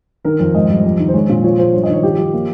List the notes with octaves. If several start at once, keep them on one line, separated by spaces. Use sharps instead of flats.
D#3 A#4
F2
G#2 D#5
G3
F2
D#3
C5
G#3 C#5
A#2
F3 C#5
F3 C5
G2 C#5
D#5
D#3 C#5
F3 G4
F3
A#3